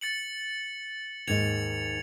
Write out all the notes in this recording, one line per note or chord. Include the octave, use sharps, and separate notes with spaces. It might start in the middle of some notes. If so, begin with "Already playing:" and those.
A6 C#7 F#7
D#2 G#2 D#4 G#6 C#7 F7